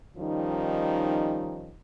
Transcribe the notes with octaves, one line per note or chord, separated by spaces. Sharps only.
D#3 F3 G3 C#4 D#4